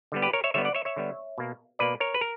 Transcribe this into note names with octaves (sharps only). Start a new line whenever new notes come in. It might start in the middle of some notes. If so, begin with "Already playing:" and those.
D3 G3 B3
G4 B4
A#4 C#5
C#5 E5
D3 G3 B3 C#5 E5
D5 F#5
C#5 E5
C#5 E5
D3 G3 B3
B2 A#3
B2 A#3 B4 D5
A#4 C#5
B4
A#4